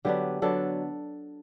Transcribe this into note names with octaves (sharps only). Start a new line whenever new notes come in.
D3 F#3 B3 D4 G4
D3 F#3 B3 D4 A4